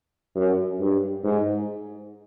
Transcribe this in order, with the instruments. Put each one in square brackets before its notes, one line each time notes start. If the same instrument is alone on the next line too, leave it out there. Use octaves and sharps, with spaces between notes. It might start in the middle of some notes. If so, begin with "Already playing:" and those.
[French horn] F#2
G2
G#2